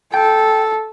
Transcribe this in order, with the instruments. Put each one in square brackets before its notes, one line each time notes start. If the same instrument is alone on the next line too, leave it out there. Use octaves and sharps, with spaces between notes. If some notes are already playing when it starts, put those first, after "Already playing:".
[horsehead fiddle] A4 [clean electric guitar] G5